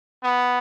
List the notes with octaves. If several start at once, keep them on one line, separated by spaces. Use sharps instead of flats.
B3